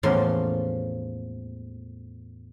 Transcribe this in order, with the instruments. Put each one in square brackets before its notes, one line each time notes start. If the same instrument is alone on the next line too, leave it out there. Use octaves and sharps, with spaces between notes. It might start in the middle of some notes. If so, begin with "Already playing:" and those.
[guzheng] E2 A2 F3 A#3 C#4 C6